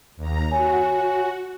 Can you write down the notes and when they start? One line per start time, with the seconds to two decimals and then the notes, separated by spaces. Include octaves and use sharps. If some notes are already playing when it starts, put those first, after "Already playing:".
0.16 D#2 A#5
0.51 F#4 C#5 G#5